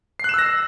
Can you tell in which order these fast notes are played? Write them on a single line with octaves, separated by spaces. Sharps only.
C7 F#6 E7 E6 A#6